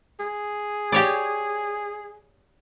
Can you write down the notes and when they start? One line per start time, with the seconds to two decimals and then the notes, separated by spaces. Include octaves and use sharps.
0.20 G#4
0.92 G4 C#5 D5